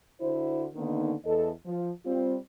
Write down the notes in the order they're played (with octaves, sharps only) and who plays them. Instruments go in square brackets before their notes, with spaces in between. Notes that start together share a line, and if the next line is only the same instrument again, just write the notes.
[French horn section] D3 E4 F#4 C5
D3 D#3 A#3 B3 D#4
E2 A4 D#5
F3
G3 C4 F4